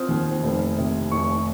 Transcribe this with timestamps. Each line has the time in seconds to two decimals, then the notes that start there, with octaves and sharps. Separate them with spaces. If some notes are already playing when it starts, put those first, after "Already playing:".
Already playing: F3 C4 D#6 F6
0.09 D#2
0.43 F1
0.78 C3
1.11 F1 C#6